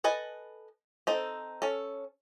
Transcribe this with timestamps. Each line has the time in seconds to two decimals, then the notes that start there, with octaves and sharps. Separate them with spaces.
0.04 A4 B4 D#5 G#5
1.07 C4 D#4 A4
1.62 C#4 A4